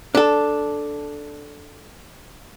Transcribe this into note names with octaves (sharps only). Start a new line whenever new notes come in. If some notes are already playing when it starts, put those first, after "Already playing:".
D4 A4